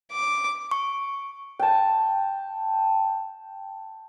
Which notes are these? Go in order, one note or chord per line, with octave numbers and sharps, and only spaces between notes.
D6
C#6
G5 A5